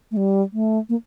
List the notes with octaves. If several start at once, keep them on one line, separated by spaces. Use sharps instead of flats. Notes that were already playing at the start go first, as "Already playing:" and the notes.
A3
G3
A3
A#3